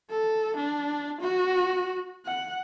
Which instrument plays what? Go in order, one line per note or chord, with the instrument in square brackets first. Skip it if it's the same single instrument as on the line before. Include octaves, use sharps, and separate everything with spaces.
[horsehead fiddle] A4
D4
F#4
F#5